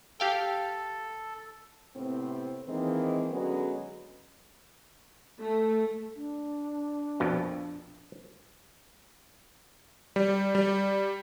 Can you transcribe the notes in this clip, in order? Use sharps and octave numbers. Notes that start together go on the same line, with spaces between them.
G4 A4 F5 G5
A2 C3 B3 C4
D#3 E3 G#3 A#3 C4
D3 F#3 G#3 B3 C#4
A3
D4
A#1 F2 B2
G3
G3